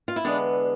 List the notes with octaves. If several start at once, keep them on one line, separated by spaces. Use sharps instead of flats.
F4
E4
E2 D3 G#3 B3 D4